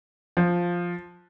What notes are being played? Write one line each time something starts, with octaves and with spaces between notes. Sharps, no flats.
F3